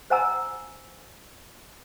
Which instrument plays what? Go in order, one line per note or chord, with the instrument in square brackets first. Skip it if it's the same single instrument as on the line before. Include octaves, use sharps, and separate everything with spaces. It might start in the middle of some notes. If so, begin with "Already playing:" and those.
[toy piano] C5 D#5 F#5 G#5 A#5 E6